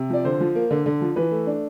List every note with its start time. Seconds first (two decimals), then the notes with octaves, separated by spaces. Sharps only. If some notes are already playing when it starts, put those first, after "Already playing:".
Already playing: C3
0.10 F3 D5
0.25 D3 C5
0.40 F3
0.55 A#3
0.71 D3
0.86 D3
1.01 F3
1.16 E3 B4
1.31 A3
1.47 D4